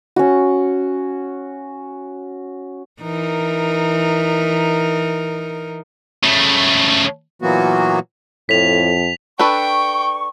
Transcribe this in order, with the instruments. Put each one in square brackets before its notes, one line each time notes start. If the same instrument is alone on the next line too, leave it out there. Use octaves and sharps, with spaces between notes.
[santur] C#4 F#4
[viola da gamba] E3 D#4 A#4
[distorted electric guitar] C#3 A3
[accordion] A#2 E3 F#3 A#3 B3 F#4
[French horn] F2 [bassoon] A2 [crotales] B6 F7
[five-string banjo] D4 A4 B4 [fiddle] G5 [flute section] C#6